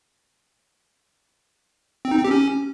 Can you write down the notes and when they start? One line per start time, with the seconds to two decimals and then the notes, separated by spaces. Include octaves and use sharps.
2.05 C4
2.11 D#4
2.18 C4
2.24 G4
2.31 C#4